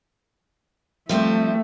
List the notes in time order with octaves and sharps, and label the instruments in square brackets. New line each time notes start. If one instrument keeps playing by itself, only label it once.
[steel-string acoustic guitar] F3 G3 C4 [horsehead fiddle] A3 E5